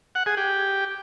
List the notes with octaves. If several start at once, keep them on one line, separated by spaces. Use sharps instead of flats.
F#5
G#4
G4